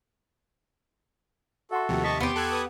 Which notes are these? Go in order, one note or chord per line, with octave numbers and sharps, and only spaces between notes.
F#4 A4 E5 F#5 C6
D#2 C3 F3 A3 G4
D#5 A5 C#6 B6
E2 B3 G4 C6 C#6
A4 F#6 G#6
B4 D#6